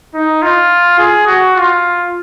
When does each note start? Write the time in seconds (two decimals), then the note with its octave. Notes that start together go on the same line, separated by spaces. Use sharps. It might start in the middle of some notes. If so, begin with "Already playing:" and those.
0.14 D#4
0.42 F4
0.98 G#4
1.27 F#4
1.56 F4